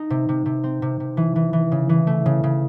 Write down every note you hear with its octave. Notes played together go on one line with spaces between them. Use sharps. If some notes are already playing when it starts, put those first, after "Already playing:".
Already playing: D#4
C3
C3
C3
C4
C3
C3
E3
E3
E3
C#3
E3
A3
C#3
C#3